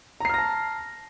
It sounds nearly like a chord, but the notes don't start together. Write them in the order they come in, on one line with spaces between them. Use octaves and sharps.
A#5 C7 F6 A#6 A5